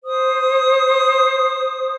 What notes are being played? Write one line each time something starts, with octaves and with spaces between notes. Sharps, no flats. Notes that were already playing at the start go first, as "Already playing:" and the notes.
C5 D#6